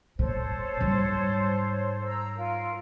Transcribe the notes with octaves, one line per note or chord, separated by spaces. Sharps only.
A#2 A4 C5 C#5
G#2 G3
A#5 E6
F4 A#4